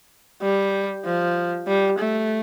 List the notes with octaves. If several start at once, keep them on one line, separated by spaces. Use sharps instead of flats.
G3
F3
G3
A3